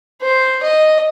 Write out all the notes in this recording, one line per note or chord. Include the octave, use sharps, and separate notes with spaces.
C5
D#5